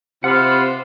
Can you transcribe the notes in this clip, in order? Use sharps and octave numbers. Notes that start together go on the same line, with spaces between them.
C3 F4 C5 F#5 B5